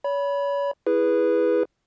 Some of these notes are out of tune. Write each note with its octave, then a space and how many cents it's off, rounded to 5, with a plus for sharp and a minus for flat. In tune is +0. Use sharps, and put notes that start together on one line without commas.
C#5 +35 B5 -10
E4 +0 G#4 -15 B4 +0